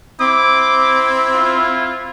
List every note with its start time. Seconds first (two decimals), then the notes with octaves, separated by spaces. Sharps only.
0.21 C4 E4 D6
1.33 F4